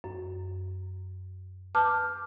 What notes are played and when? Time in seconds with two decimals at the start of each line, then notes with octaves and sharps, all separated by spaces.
0.04 F#2
1.75 B4 A5 D6 F6 G6